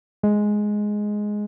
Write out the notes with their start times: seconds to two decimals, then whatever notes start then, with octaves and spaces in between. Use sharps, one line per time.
0.23 G#3